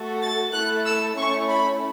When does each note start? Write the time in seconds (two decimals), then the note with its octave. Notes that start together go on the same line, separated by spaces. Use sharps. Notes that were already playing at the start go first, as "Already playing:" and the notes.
Already playing: A3 F#4 A4
0.22 A6
0.53 A3 E4 A4 F#6
0.86 E6
1.17 A3 C#4 E4 C#6
1.48 B5